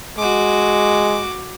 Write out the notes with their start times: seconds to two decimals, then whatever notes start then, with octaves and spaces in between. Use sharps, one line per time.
0.18 G#3 F#4 D6